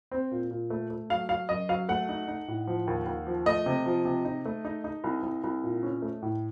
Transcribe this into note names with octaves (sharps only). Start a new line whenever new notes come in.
C4
A#2
A#2
A3
A3
F#3 F5
F#3 F5
F#2 D#5
F#3 F5
A3 F#5
D#4
D#4
A2
F3
D#2
D#2
F3
A3 D#5
C3
F3
C3
D#4
A3
D#4
D#4
C2
C2
C2
A#2
C#4
A3
A2